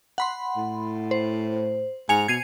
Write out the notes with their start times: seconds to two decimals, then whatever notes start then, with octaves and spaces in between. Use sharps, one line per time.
0.18 F#5 B5 C6
0.56 A2
1.11 C5
2.09 G#2 G#5 C#7 F7
2.28 B2 G#6 C7 D#7